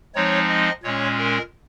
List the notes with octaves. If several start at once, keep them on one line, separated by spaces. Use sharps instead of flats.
F3 G#3 C4 D#4 C#5
D#5
A#2 G#3 C#4 C#5
A#4